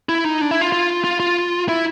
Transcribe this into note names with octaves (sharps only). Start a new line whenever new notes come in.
E4
D#4
D4
E4
F4
F4
F4
F4
E4